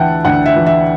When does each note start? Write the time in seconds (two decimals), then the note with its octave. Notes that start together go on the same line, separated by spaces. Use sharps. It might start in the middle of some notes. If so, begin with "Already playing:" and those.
Already playing: D2 E3 E5 F#5 G5 A5
0.25 D2 F#5
0.46 E5
0.56 E3
0.66 E5